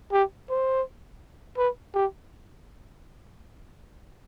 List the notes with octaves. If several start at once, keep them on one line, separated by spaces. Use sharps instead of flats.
G4
C5
B4
G4